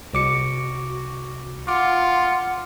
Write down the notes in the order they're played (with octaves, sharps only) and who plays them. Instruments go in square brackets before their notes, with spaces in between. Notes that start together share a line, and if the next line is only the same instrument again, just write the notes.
[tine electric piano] C2 D6 C#7 [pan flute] F#4
[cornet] F4 [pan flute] F#5 [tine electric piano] D6